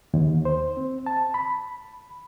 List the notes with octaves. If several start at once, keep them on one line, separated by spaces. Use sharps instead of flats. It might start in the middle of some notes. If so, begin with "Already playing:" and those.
D#2
C5
C4
A5
B5